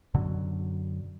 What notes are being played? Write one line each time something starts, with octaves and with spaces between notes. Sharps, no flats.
F#2 B2 D3 F#3